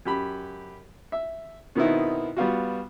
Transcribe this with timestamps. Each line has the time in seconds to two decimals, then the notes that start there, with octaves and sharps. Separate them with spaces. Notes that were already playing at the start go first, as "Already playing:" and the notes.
0.05 F#2 G4 B5
1.12 E5
1.75 B2 D#3 B3 C4 D#4 E4
2.37 G3 B3 F4 F#4